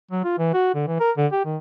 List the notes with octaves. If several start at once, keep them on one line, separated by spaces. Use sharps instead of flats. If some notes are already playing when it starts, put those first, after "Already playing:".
F#3
F4
E3
F#4
D3
E3
A#4
D3
G4
D#3